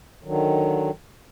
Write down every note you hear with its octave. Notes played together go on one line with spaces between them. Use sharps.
D3 D#3 F#3